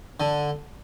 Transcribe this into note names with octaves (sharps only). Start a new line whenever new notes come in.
D3